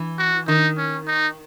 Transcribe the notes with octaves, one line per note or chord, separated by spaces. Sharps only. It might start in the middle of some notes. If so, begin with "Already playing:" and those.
Already playing: E3
F#4
D#3 D#4
C#4
D#4